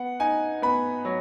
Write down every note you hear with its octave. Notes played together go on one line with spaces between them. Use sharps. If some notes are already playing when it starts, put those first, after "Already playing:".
Already playing: B3 F#5
D#4 G#5
B3 B5
F#3